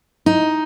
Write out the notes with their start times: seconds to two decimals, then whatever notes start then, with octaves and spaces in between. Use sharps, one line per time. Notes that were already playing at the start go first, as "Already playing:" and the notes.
0.26 D#4